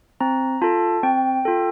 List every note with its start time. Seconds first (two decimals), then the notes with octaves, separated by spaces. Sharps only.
0.21 C4 A#5
0.62 F4 A4 A5
1.03 C4 G5
1.45 F4 A4